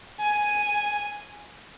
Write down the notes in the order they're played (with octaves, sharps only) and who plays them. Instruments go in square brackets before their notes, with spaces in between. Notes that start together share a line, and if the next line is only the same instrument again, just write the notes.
[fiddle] G#5